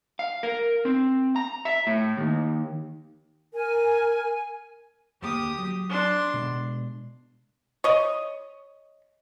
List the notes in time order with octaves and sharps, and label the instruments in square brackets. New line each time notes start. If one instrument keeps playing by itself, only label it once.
[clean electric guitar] F5
A#4
C4
A#5
E5
A2
D#2
[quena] A#4 [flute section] G#5
[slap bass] D2 A#3 [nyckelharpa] G4 D#6
[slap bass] F#3
[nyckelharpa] D4 C6
[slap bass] B2 G#3
[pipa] C#5 D#5